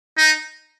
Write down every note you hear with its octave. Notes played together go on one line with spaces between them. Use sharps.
D#4